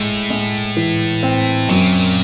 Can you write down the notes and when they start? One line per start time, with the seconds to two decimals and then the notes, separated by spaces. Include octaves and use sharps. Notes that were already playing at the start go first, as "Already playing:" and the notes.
Already playing: A2 G#3
0.30 G#3
0.77 E3
1.23 C4
1.69 F#2 A#2